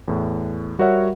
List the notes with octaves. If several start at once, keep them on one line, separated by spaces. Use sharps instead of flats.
E2 A2
G3 F#4 A#4 C#5 E5 F#5